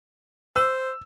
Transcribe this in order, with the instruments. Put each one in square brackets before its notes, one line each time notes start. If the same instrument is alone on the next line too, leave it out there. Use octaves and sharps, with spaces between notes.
[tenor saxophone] C5 [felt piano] E6